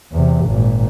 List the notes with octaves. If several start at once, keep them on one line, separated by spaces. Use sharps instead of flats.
E2 C3
G#1 A#2